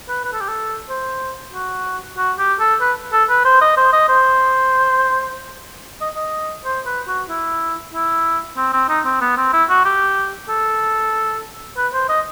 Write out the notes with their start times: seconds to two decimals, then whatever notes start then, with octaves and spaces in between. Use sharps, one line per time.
0.09 B4
0.25 B4
0.33 A4
0.41 G4
0.48 A4
0.89 C5
1.53 F#4
2.17 F#4
2.39 G4
2.60 A4
2.81 B4
3.13 A4
3.29 B4
3.45 C5
3.61 D#5
3.77 C5
3.93 D#5
4.09 C5
6.01 D#5
6.16 D#5
6.65 C5
6.86 B4
7.08 F#4
7.30 E4
7.93 E4
8.57 C4
8.73 C4
8.89 D#4
9.05 C4
9.21 B3
9.37 C4
9.53 E4
9.69 F#4
9.85 G4
10.49 A4
11.77 B4
11.93 C5
12.09 D#5